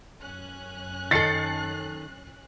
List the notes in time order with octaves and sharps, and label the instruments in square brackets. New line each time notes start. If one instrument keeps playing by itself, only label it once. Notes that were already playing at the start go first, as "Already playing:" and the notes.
[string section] F#2 C#4 F#6
[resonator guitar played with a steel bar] D#3 A4 [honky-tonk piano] A6 C7 C#7